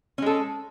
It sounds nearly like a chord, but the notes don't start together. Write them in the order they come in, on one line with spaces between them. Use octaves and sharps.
C#4 G#3 A4